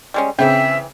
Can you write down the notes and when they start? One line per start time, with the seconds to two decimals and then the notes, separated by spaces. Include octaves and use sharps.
0.14 G3 G#3 C#4
0.39 C#3 E3 C4 E5 G5